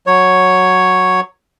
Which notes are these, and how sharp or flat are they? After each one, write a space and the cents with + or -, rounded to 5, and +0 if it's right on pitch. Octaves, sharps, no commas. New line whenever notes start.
F#3 -5 C#5 +0